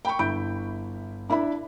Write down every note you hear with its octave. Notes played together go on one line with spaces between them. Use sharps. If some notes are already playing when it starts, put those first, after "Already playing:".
G5 B5 C#6
G1 E4 B5 G6 D7
D4 E4 E5 B5